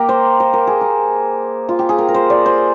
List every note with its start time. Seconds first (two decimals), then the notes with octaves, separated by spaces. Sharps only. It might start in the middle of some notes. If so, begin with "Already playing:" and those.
Already playing: A#3 G4 A#4
0.09 C5
0.40 C5
0.53 A#4
0.67 G#4
0.81 A#4
1.69 F4
1.79 G4
1.89 G#4
1.98 A#4
2.08 A#4
2.14 C5
2.30 D5
2.46 C5